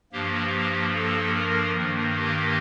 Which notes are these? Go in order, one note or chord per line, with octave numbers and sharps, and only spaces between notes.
G2 F3 A#3 G4
A4
A#4
G2 D#3 A#3
G4